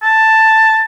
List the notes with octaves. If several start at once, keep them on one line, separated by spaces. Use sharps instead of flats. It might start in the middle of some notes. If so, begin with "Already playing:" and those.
A5